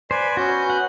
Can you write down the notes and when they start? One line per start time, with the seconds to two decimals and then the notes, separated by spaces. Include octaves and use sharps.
0.11 B4 C5 D5 G#5
0.37 B3 C#4 F#4 G6
0.70 F#5